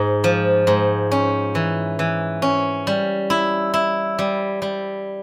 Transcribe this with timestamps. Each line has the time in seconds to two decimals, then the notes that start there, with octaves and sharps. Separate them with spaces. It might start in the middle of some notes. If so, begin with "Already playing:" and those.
Already playing: G#2
0.24 F3
0.67 G#2
1.11 C#4
1.55 E3
1.99 E3
2.42 C#4
2.87 G3
3.30 E4
3.74 E4
4.19 G3
4.62 G3